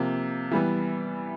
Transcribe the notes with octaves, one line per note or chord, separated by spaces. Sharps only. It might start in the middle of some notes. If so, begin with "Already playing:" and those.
Already playing: C3 F3 A#3
E3 G3 B3